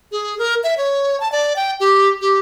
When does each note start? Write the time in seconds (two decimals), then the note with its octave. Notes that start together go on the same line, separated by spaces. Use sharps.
0.12 G#4
0.38 A#4
0.63 E5
0.77 C#5
1.20 A5
1.32 D5
1.56 G5
1.80 G4
2.21 G4